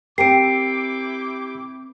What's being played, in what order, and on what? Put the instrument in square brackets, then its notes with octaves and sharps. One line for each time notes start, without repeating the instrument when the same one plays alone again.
[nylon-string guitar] C4 A#4 [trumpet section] E4 G5 D6 [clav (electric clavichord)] G4 [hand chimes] C7 D7